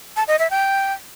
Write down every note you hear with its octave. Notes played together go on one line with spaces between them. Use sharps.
A5
D#5
E5
G5